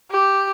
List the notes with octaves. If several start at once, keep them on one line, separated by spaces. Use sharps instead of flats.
G4